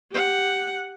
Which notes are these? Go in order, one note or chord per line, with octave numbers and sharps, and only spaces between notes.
G4 F#5